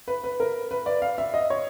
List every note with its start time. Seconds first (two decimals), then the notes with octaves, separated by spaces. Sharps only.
0.08 B4
0.24 B4
0.40 A#4
0.71 B4
0.86 D5
1.02 F5
1.18 E5
1.34 D#5
1.50 C#5